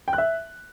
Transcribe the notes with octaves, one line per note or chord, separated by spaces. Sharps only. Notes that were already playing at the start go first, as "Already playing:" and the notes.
G5
F#6
E5